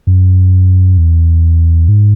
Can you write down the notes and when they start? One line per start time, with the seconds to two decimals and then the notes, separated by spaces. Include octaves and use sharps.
0.07 F#2
0.98 E2
1.88 G#2